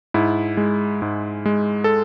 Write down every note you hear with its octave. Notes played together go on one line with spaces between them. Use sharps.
G#2 E4
G#3
G#2
G#3
A4